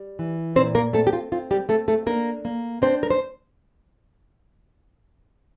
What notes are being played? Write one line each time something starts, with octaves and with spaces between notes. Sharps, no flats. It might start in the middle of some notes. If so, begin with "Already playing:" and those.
Already playing: G3
E3
A#2 C4 C5
A#3 A#4
A3 C4 A4
G4
F4
C4 F4
G3 G4
A3 C4 A4
A3 A4
A#3 D4 A#4
A#3
C4 D4 C5
A#4
C5